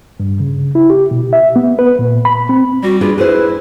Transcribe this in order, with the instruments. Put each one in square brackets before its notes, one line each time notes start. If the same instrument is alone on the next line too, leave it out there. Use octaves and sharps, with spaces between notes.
[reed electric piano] G2
C#3
E4
G4
B2
E5
B3
B4
A#2
B5
C4
[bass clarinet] G3 [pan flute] F#4
[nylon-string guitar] D4 G#4 B4 [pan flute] F4
[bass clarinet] E4 [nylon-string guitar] G#4 C5 [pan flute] B4